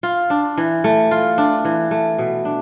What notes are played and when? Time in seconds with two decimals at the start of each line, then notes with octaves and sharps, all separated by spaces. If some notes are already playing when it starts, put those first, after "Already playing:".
0.03 F4
0.30 D4
0.57 E3
0.84 A3
1.11 F4
1.38 D4
1.65 E3
1.91 A3
2.18 B2
2.45 D4